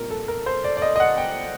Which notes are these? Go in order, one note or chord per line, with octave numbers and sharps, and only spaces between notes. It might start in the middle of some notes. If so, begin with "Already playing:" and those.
Already playing: A#1 A#2 G3 C4 A#4
A4
A#4
C5
D5
D5
D#5
D#5
F#5
G5